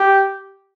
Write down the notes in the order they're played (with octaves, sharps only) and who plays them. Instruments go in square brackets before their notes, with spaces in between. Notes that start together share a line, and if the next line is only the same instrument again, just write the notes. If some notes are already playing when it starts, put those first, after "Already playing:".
Already playing: [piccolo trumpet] G4